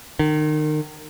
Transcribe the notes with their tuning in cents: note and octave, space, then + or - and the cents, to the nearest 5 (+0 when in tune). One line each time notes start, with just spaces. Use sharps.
D#3 -30